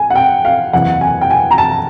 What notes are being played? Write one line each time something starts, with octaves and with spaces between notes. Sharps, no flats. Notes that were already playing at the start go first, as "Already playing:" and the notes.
Already playing: G#5
F#5
G5
F5
F#1 E2 C3 F#5
G#5
G5
G#5
A#5
A5